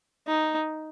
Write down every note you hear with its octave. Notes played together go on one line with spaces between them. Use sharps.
D#4